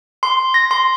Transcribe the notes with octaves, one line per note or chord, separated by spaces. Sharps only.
C6
A#6
C6